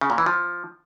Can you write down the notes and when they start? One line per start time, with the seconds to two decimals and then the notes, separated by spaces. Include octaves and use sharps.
0.01 C#3
0.10 A#2
0.18 E3
0.26 F3